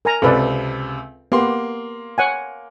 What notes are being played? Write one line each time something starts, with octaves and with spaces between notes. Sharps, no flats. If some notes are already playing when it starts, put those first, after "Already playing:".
A#4 G#5 A#5
C#2 C3 A4 B4 D5
A#3 B3 G4 C6
C#5 F#5 G#5